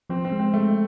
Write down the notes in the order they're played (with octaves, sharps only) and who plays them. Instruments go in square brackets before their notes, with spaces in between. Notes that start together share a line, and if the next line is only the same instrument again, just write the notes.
[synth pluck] F3 [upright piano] C4
[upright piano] C4
[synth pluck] G#3
[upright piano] C4
[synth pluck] G#3 [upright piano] A3